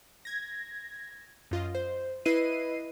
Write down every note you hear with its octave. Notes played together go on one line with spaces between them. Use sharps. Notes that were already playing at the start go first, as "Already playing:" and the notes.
G#6 A#6
F#2 F4 D#5
C5
E4 B4 D#5 C7 D#7